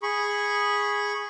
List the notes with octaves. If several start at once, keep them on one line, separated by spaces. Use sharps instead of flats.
G#4 B5 C#6